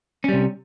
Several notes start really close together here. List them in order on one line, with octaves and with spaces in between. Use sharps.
C#4 G3 C3